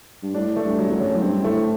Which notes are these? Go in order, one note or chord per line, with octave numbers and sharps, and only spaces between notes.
G2
A2 D4
A3
G2
F#3
E2
F#2
F#3
A2
G2 C4
A2 A3